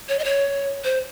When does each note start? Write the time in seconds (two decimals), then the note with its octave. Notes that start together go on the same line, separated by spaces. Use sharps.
0.09 C#5
0.19 D#5
0.24 C#5
0.84 C5